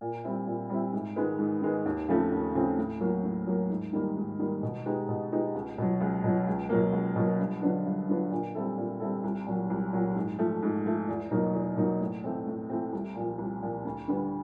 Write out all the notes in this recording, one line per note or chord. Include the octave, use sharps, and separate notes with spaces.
A#2
G3 C4 E4
A#2
G3 C4 E4
G#2
D#3 G#3 B3
G#2
D#3 G#3 B3
D#2
C#3 F3 A3 C4
D#2
C#3 F3 A3 C4
A2
F#3 A#3
A2
F#3 A#3
G#2
D#3 G3 A#3
G#2
D#3 G3 A#3
B2
G#3 B3 D#4 G4
B2
G#3 B3 D#4 G4
C#2
B2 F#3
C#2
B2 F#3
C#2
B2 F#3 A#3
C#2
B2 F#3 A#3
G2
D3 F#3 B3 D4
G2
D3 F#3 B3 D4
A#2
G3 C4 E4 A4
A#2
G3 C4 E4 A4
C2
A#2 F#3
C2
A#2 F#3
G#2
F3 A3
G#2
F3 A3
E2
B2 F#3 A#3 D#4
E2
B2 F#3 A#3 D#4
A2
E3 A3 C4
A2
E3 A3 C4
C2
A#2 F3
C2
A#2 F3
D2
D3 G3 B3